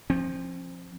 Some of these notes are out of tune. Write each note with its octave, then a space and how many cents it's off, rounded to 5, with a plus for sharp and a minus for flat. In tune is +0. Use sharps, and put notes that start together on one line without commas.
F3 +0 C4 +40